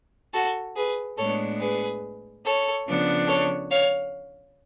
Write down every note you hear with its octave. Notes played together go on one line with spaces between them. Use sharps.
F#4 A4
G#4 B4
A2 G#3 B3 D4 A4 C#5
G#4 B4
A4 C#5
C#3 F3 B3 D4
A4 C#5
C#5 F5